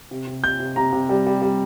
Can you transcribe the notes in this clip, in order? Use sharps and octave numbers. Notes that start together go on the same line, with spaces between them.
C3
C3
C3 G6
C3
C3 A#5
C3
G3
G3
G3